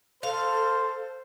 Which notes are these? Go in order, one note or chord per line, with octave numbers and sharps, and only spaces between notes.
A4 C5 F5